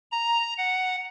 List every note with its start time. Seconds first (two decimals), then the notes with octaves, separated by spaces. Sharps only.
0.11 A#5
0.58 F#5